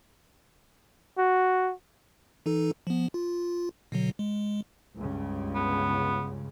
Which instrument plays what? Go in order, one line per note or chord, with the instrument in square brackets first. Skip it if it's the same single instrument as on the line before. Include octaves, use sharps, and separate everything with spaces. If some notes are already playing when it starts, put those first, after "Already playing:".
[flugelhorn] F#4
[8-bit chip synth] E3 D#4 A4
F3 B3
F4
B2 D3 F#3
G#3
[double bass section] C#2 G2 C#3
[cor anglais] B3